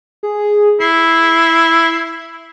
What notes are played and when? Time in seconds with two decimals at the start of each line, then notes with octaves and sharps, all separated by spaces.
0.23 G#4
0.80 E4 C7